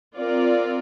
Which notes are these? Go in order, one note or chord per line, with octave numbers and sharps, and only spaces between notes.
C4 F4 A#4 D5